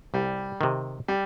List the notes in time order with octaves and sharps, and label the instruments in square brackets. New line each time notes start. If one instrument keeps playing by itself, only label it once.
[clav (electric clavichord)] C2 [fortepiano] G3
[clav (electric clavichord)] C3 D#3
[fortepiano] G3